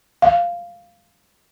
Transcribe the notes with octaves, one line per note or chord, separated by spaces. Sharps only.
F5